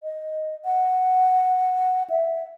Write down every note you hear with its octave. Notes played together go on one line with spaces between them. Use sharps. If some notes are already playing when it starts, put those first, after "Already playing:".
D#5
F#5
E5